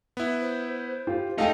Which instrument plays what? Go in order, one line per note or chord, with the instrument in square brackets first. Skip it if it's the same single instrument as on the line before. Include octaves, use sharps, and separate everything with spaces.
[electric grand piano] B3 E4
[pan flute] C5
[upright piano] F4 G4
[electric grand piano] G#3 A3 [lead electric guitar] D#4 [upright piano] F5 G5